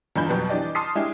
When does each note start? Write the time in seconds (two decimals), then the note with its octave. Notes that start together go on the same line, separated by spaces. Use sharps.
0.16 E2 G2 G#3 F4 B5 G6
0.28 F2 B2 F#3 G3 B3
0.49 E3 D4 G4 D5 D#5
0.75 A5 C6 D#6 F6 C7
0.95 G#3 D4 E4 G4